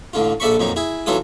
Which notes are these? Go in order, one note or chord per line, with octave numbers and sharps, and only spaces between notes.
A1 D3 F4
A#1 A4 D5 E5 B5 C#6
F2 A#2 F#3 D#4
E4 G#4
B1 E3 F#3 F4 A4 D#6